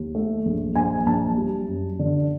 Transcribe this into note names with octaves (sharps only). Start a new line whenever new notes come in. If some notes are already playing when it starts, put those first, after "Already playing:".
Already playing: D#2
A3
A#1
A#1 G#5
A#1 A5
G3
F#2
D3